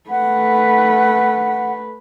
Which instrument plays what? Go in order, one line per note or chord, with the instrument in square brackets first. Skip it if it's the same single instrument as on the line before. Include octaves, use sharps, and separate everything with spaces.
[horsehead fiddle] A3 B4 [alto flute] F#5